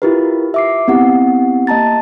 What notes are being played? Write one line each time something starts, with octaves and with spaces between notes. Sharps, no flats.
E4 F4 G4 A#4 B4
E5 D6 C7
B3 C4 E4 G4 F#5
A#3 D#5 A5 A#5 A6